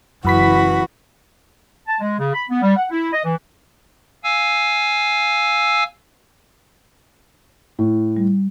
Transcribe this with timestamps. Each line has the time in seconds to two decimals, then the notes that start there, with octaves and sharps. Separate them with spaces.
0.25 F#1 F#2 E3 F#4 B5 B6
1.88 A5
2.00 G#3
2.19 C#3
2.34 B5
2.50 B3
2.62 G3
2.76 F#5
2.91 E4
3.13 D#5
3.24 E3
4.24 F5 G#5 E6
7.79 A2
8.17 G3